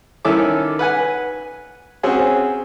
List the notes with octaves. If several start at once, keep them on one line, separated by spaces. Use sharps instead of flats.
D#3 C#4 E4 A4 D6
B4 F#5 G#5
C4 C#4 F#4 G#4